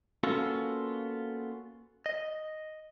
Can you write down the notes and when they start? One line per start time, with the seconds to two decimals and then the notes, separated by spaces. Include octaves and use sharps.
0.23 A#3 B3 C#4 F4 F#4 A4
2.06 D#5